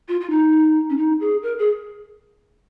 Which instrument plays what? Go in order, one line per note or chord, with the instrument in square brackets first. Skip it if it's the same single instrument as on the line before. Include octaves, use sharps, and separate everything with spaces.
[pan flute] F4
F4
D#4
C#4
D#4
G#4
A#4
G#4